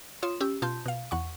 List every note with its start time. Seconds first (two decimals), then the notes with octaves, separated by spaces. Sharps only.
0.22 F4 C#5 C6 D#6 E7
0.40 C#4 G4 E6
0.62 B2 F4 A5 C6 G6
0.86 B2 F5
1.11 E2 F#5 C#6